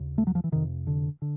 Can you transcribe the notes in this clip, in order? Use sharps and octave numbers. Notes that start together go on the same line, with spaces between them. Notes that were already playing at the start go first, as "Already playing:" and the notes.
Already playing: D#2 C#3
A3
F#3
F3
E3
F2 C3 D#3
D3
D3